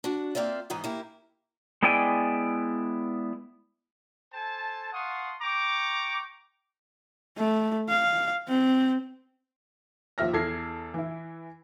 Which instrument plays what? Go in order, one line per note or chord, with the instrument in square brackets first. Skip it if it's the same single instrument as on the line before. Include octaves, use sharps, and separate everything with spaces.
[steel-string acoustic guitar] D4 F#4
A#3 C4 F4 D5 E5
G#2 E3 B3 D#4
A#3 E4 G4
[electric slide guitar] G#3 B3 E4 D5 G5 G#5
[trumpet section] A4 C5 G#5 A5
F5 F#5 A5 C6 C#6 D#6
G5 A#5 C#6 D6
[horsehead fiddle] A3
F5
C4
[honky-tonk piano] D#2 F3 E5 F6 A#6
E2 A4 G#6 C7
E3 E4